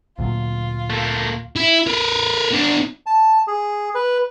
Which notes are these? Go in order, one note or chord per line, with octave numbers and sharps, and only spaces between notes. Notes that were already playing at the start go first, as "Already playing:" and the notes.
D2 A#2 F#3 F4
A3 A#3
E4
A#4 B4
B3 D4
A5
G#4
B4